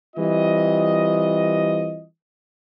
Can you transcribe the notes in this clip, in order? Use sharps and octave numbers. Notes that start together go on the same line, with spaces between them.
E3 G3 C4 F4 D#5